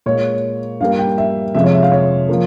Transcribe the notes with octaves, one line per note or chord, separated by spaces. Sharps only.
A#2 G#3 C#5
G2 G3 A#3 F5
G5
E5
F2 C3 F3 G#3 E5
C#5
E5
F5
C#5
F3 A#3